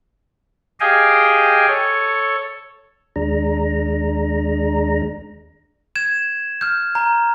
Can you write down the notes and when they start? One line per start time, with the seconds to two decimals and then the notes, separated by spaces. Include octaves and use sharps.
0.80 G4 G#4 D#5 F5 G5 G#5
1.67 A4 C#5
3.16 D#2 G#3 D4 A#5
5.95 G#6 E7
6.61 F6 G6
6.95 A#5